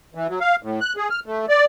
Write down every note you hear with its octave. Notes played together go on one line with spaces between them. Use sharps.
E3
F#3
F5
A2
F#6
G#4
F6
A3
D5